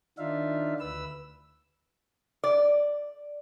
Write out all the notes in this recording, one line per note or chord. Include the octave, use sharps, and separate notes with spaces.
D#3 D4 D#4 F4 E5 F5
D2 B4 E6
D5